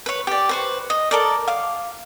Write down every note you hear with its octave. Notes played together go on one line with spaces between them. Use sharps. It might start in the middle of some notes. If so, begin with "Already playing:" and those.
B4 C#5
G4 D5
B4 C5 C#6
D#5
A4 A#4 D5
F5 D6